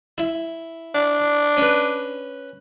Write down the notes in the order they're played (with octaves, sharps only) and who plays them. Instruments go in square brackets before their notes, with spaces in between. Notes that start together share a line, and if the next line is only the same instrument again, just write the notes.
[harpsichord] E4
[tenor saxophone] D4
[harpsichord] C#4 B4